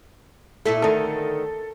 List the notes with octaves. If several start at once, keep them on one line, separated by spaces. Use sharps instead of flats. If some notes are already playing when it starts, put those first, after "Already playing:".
A#2 A3 E4 A4
D2 D#3 A4